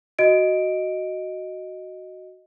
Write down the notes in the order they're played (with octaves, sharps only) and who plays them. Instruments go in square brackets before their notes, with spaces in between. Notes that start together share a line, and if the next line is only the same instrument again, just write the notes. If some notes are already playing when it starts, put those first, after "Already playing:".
[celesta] F#4 D#5 D7